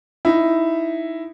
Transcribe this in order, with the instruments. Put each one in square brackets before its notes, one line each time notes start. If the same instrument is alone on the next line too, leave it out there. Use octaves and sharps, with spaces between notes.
[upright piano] D#4 E4